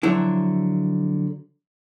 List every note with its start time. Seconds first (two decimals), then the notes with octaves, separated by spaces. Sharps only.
0.03 D3 F3 F#3 E4